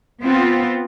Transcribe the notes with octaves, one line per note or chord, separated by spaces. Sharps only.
B3 C4 F4